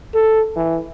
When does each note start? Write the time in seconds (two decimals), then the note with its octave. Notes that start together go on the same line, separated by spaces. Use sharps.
0.14 A4
0.56 E3